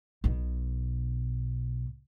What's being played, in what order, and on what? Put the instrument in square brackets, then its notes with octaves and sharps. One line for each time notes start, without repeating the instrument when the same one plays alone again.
[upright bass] B1 B2